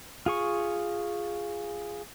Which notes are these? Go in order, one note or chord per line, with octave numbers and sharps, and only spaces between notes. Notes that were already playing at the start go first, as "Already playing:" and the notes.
F4 G#4 C#6